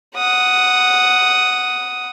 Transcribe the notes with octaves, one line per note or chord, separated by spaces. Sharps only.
F#5 D#6